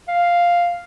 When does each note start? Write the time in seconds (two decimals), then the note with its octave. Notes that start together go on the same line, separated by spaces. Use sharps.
0.08 F5